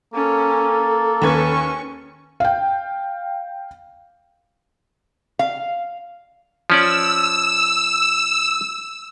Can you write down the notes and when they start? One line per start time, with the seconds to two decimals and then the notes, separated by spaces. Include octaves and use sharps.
0.14 A#3 C#4 A4
1.22 D#2 C#4 B4 C#6 G#6
2.40 F5 G5
5.39 F5
6.70 F3 C#4 D5 E6